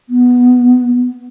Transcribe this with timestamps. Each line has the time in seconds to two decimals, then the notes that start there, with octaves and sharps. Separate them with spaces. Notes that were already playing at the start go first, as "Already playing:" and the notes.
0.09 B3